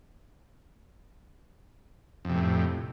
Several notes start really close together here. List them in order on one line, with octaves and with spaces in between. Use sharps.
F2 C3 A2